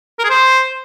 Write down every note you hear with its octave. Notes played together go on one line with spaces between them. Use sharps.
A#4
G#4
C5